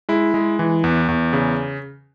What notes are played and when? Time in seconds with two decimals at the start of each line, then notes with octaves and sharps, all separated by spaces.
0.09 G#3 E4
0.34 G#3
0.59 E3
0.84 E2
1.08 E2
1.33 C#3